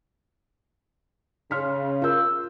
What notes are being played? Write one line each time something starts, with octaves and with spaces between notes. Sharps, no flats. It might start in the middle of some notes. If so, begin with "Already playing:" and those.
C#3 C6 F6 B6
F4 A#4 E6 G6